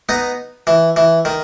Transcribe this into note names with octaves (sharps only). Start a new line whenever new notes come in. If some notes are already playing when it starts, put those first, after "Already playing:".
B3 D#4
E3
E3
D#3